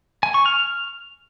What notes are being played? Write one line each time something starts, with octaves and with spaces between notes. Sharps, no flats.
G#5
C#6
F6